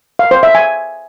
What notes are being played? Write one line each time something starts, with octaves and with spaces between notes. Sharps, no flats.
F5
C5
E5
G#5